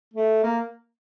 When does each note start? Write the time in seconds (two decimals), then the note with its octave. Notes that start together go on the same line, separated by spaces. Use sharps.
0.13 A3
0.43 A#3